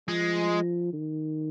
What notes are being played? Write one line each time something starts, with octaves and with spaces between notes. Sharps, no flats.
F3 G#3
D#3